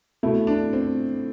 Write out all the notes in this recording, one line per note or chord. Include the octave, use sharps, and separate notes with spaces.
B2 A3 E4
D4
C4